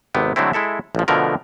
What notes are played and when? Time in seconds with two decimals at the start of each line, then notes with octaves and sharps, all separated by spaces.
0.14 G#1 C3 B3 G5
0.36 D3 F#3 G#3 A3 C4 E4
0.53 G#3 E4 A4 E5
0.95 A1 F3
1.08 B2 D3 F3 A3 A#4